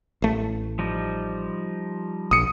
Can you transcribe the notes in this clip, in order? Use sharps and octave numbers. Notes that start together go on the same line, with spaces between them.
A1 A3
F3 G3 D#4
A#1 D#6 C#7